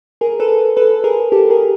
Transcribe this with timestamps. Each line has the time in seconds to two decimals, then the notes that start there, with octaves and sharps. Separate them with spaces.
0.21 G#4 A#4
0.40 A4 B4
0.77 A4 B4
1.04 G#4 A#4
1.32 G4 A4
1.50 G#4 A#4